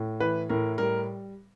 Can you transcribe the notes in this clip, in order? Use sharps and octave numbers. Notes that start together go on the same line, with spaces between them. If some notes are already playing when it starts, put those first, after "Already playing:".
Already playing: A2
E3 B4
A2 A#4
G3 A#4